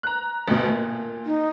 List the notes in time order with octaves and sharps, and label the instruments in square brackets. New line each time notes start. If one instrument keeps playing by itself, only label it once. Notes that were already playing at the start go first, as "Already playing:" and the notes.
[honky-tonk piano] A#5 F#6
A1 D2 B2
A#2
[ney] D#4